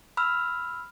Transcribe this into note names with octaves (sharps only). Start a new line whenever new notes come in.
B5 E6 F6